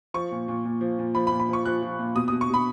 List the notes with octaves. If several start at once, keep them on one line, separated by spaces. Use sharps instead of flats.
F3 C#6
A#2
A#2
A#2
F3
A#2
F3 B5
B5
A#2
B5
F3 C#6
F3 F#6
F3
A#2
B2 D#6
B2 D#6
C#6
B2 B5